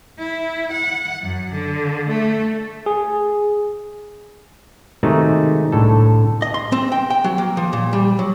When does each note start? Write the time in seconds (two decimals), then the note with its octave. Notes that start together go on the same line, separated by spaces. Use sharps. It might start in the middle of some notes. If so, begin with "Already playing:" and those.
0.19 E4
0.72 F#5
1.22 F#2
1.53 D3
2.09 A3
2.86 G#4
5.03 C3 D#3 G#3 A3 D#4 F#4
5.72 C2 A2 D3 A4
6.42 D#5
6.54 C6
6.72 C4
6.92 G5
7.10 G5
7.24 F#3
7.38 A#3
7.57 F3
7.73 A#2
7.93 G3
8.19 F#3